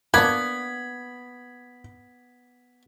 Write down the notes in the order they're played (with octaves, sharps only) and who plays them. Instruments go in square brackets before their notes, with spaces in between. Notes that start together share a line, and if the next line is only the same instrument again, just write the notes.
[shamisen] A#3 D4 [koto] B3 [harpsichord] B5 [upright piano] G#6